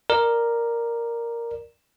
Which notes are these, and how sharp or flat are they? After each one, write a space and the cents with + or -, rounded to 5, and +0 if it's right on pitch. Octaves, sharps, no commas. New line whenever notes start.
A#4 +0 D5 +10